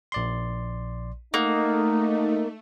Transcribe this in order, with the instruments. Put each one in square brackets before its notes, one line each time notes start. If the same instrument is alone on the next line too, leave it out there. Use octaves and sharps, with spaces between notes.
[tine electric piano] A#1 D5 C6
[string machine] A3 [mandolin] A#3 [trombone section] D#4 [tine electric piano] D#5 F#5